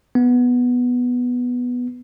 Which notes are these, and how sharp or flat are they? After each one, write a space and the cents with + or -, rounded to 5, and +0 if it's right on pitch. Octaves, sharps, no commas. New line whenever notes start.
B3 -5